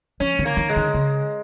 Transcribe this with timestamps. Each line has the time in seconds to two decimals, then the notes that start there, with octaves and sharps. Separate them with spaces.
0.20 F3 C#4
0.39 D#3
0.45 A#3
0.57 D#3
0.69 G#3
0.76 D#3
0.94 C#3